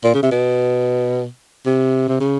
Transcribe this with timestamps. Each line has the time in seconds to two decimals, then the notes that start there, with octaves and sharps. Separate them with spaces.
0.04 A#2
0.14 C#3
0.23 C3
0.31 B2
1.66 C3
2.08 C3
2.20 C#3